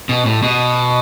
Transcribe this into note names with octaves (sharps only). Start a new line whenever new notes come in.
B2
A2
B2